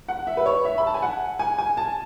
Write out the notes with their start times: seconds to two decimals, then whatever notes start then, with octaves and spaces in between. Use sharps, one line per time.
0.08 F#5
0.27 E5
0.37 B4
0.46 C#5
0.65 E5
0.78 B5
0.87 A5
0.94 G#5
1.02 F#5
1.39 G#5
1.58 G#5
1.77 A5